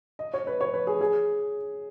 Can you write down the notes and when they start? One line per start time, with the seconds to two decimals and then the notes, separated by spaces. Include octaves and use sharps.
0.19 D#5
0.34 C#5
0.47 B4
0.61 C#5
0.74 B4
0.87 G#4
1.01 G#4